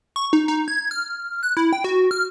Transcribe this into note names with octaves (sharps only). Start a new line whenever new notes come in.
C#6
D#4
D#4
G#6
F6
F#6
E4
G5
F#4
F6